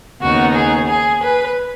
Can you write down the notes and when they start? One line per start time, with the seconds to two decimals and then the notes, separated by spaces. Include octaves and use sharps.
0.21 D#2 C#3 B3 D#4 F#4
0.54 G#4
0.88 G#4
1.23 B4